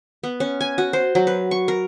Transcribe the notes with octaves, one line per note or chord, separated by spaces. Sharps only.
B3
C#4
G#5
F#4
C5
F#3
B4
C#6
A#4